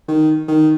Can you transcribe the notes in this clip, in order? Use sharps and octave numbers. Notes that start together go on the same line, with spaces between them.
D#3
D#3